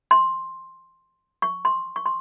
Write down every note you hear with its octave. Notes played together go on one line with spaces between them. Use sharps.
C6
C#6
C6
C#6
C6